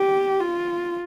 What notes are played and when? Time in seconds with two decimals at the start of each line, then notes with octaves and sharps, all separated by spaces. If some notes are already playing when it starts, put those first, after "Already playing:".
Already playing: G4
0.40 F4